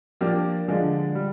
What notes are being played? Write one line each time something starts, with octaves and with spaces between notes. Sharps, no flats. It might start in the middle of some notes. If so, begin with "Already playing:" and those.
F3 A#3 D4 G4
D3 F3 G#3 D4 F4
G3